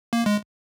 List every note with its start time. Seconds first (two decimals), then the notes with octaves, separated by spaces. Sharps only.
0.13 A#3
0.26 G#3